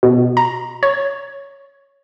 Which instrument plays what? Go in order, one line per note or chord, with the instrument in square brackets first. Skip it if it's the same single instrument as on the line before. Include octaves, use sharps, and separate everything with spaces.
[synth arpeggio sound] B2
A#5
C#5